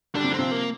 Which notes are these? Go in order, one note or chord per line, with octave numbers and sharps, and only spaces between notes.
D3 G3 D4
C3
D3 C4
C3 F3
A#3